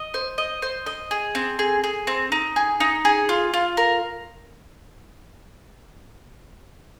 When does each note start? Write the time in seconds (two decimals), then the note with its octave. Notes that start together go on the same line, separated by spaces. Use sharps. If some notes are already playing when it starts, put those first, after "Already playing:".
Already playing: D#5
0.14 C5
0.38 D#5
0.62 C5
0.86 D#5
1.11 G#4
1.35 C4
1.59 G#4
1.84 G#4
2.07 C4
2.32 D#4
2.56 G#4
2.80 D#4
3.05 G#4
3.29 F4
3.54 F4
3.77 A#4